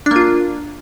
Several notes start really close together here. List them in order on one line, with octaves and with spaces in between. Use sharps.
D4 A#3 F4